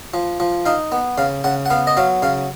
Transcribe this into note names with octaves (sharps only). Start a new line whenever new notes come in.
F3
F3
D#4 F5
B3
C#3 F5
C#3 F#5
F#5
B3 F5
D#5
F#3 F5
C#3 F5